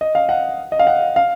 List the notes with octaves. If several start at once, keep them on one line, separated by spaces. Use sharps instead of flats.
D#5
F5
F#5
D#5
F5
F#5
F5